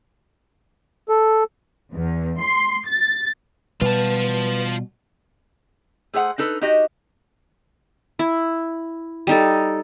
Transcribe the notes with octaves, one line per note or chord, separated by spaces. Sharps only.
A4
E2
C6
A6
B2 G3 F4 B4 A5
A3 G#4 C5 F5 F#5
D4 D#4 A4 B4
D#4 F#4 G4 D#5
E4
G3 D#4 A4